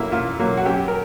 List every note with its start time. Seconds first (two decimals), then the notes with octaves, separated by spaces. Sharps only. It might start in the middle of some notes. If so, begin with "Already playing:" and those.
Already playing: F#3 A#3 E4
0.12 A#2 F4
0.39 F#3 A#3
0.57 F#4
0.65 F#2 G4
0.88 A#4